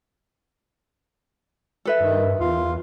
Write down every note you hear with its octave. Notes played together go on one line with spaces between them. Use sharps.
A4 B4 E5
G2 D#3
E2 F4